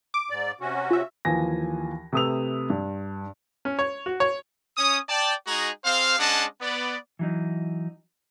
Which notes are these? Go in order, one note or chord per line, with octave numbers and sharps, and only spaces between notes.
D6
G#2 D5
C3 C#4 F#4
F4 E5
D#2 E3 F3 G#5 A#6
C3 A3 B4 D#6 E6 F7
G2
C#4
C#5
F#4
C#5
C#4 C#5 D#6
D5 G5 A5
G#3 D#4 F#4 G#4 A#5
C4 G#4 C5 F5
G#3 C#4 D4 D#5 F#5 A5
B3 D5
E3 F#3 D#4